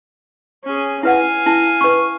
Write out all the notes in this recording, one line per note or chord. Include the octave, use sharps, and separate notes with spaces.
C#4 G#4
E4 B4 F5 F#5 G#5
E4 A5
B4 C#6